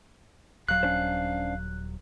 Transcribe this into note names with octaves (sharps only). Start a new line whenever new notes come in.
D#1 F#3 F5 F#6
C#4 D4 C5